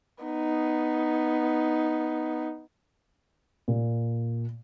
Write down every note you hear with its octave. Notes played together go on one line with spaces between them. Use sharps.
B3 D#4
A#2